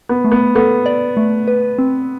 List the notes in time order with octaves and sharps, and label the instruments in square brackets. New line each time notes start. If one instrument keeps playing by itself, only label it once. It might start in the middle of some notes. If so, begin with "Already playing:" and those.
[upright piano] B3
[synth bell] A3
[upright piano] B3
[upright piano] B3 [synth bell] A4
[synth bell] D5
A3
B4
C4